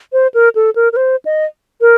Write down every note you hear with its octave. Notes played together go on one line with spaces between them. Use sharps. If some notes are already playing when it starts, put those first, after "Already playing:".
C5
A#4
A4
A#4
A#4
C5
D#5
A#4